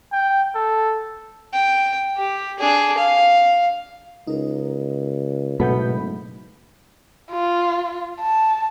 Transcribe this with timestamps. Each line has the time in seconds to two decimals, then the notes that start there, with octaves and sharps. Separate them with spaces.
0.12 G5
0.55 A4
1.53 G5
2.17 G4
2.59 D4 G#4
2.98 F5
4.27 C#2 D#4 A#4
5.60 F#1 G#2 B2 F#3 A3 B3 B5 G6
7.31 F4
8.20 A5